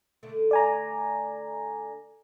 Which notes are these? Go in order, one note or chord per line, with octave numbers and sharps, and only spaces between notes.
D3 A3
D5 G#5 A#5